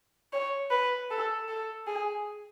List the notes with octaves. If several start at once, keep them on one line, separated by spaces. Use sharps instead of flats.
C#5
B4
A4
A4
G#4